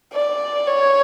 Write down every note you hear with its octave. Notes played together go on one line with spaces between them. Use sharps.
D5
C#5